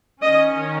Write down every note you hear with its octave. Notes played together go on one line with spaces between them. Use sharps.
D#3 C#4 D#5